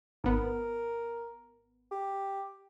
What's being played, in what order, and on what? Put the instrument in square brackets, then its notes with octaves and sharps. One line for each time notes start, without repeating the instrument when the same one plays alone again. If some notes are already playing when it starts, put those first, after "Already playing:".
[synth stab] G#1 B3 [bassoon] A#4
[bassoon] G4